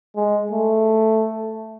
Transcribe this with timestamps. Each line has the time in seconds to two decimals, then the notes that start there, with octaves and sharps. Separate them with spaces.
0.16 G#3
0.52 A3